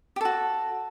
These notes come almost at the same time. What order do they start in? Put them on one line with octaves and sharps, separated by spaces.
G4 A4 F#4